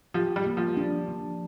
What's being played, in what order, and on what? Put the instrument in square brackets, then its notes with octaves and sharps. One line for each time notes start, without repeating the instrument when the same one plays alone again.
[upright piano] F3 [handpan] G4
[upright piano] G3
[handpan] A#3
[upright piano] F3
[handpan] D4
F3